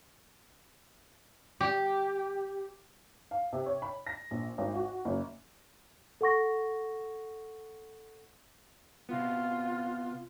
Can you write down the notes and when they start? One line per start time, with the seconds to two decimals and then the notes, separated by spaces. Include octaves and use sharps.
1.61 G4
3.31 F5
3.53 C3
3.66 C#5
3.82 B5
4.06 A#6
4.31 A#1
4.58 G#1
4.75 F#4
5.05 F#1
6.21 A4 F#5 C#6 A#6
9.09 C3 B3 F4